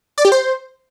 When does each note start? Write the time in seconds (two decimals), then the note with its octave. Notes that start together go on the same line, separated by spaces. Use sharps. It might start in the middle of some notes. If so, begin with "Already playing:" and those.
0.18 D5
0.25 G4
0.32 C5